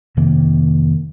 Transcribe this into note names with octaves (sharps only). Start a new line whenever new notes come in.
F2 C3 D#3 A#3